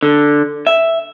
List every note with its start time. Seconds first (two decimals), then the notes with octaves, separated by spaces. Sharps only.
0.03 D3
0.67 E5